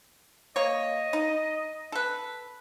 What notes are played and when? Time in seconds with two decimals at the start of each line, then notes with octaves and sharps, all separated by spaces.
0.56 A#3 C#5 D#5
1.13 D#4
1.92 A4 B4